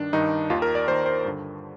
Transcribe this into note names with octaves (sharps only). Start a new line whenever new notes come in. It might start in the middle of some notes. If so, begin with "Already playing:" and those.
Already playing: G2 D#3 D4
G2 D#3 D#4
D#2 D#3 F4
A#4
D5
D#2 D#3 C5
C5
G2 D3